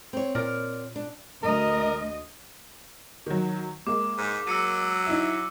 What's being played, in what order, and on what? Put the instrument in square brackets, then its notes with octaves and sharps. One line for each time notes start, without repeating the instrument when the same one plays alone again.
[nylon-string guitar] C4 C#5
[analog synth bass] A#2 [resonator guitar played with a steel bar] A#4 D5
[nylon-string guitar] D4
[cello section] D2 D#5 [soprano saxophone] A#4
[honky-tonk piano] D#3 F#3
[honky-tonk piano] G#3 A#3 [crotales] D6
[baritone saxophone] G#2
[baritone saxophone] F#3 [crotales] E6 C#7 D#7
[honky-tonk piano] D#4 E4 E5